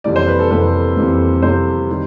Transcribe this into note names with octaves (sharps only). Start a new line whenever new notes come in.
F2 C3 E3 G3 A#3 D5
C5
B4
A4
F2 C3 E3 G3 A#3 B4
F2 C3 E3 G3 A#3
F2 C3 E3 G3 A#3 C5
D#3 G3